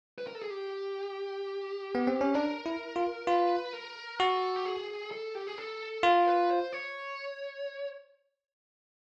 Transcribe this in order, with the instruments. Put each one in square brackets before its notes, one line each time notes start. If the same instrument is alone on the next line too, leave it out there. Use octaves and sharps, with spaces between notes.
[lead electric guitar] B4
A#4
A4
G#4
G4
[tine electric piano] B3
C4
C#4
[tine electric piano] D4 [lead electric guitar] A#4
[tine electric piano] E4
F4
[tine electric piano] F4 [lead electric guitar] B4
[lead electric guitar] A#4
[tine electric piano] F#4 [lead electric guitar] A4
[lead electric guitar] G4
G#4
A4
G4
G#4
A4
[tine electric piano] F4 [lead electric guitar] A#4
[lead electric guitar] B4
C5
C#5